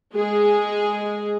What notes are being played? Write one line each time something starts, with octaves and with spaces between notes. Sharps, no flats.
G#3 G#4